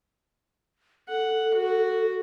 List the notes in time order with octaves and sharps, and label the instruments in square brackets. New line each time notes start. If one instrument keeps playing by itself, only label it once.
[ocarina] A4 [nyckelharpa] F#5
[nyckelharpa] F#4